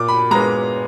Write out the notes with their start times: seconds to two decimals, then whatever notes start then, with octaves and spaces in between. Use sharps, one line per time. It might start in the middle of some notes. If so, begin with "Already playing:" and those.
Already playing: A#2 D6
0.08 B5
0.31 G#3 B3 A#5